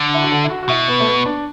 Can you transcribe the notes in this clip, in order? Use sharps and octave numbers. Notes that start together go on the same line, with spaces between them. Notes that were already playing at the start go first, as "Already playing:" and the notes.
Already playing: D3
E4
F#4
A4
E4
F#4
F#4
B2 E4
B3
A3
B3
D4